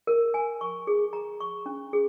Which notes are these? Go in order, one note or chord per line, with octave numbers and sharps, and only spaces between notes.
A#4
G#5
C#6
G#4
A#5
C#6
C#4
G#4